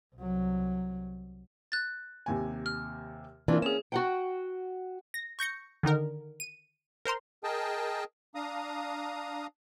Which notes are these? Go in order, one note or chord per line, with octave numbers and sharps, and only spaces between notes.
C2 F#3
F#6 A6
D#2 C3 G#5
F6
E3 A#3 C4 D4 F4
C#4 G#4 E7
F#4 F#5 G5
A#6
C#6 G6 A#6 C#7
D3 D#3 D#4 A#4
D#7
A#4 C5 A#5 C6
G#4 A#4 D#5 G5 A5
D4 F5 A#5 D#6